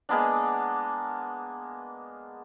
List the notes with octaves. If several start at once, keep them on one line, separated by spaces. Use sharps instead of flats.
G#3 A#3 B3 D4